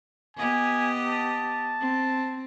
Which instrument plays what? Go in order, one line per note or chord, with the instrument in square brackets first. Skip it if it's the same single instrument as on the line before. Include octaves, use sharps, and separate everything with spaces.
[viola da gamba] B3 G4 D#5 [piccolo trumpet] G#5
[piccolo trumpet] A5
[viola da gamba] C4